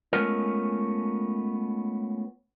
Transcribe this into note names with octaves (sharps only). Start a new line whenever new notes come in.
G#3 A3 B3 C#4 F4 A#4